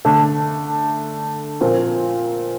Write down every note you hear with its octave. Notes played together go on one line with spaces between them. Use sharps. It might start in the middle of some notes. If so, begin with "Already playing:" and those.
D3 A3 D4
A#2 F3 C4 F4 A#4